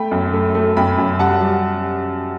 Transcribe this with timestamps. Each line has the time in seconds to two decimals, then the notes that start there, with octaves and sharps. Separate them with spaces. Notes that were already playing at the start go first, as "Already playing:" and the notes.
Already playing: A3 G5 B5
0.11 F#2
0.33 A3
0.55 A3
0.77 F#2 G5 B5
0.98 F#2
1.19 G3 F#5 A5
1.41 G3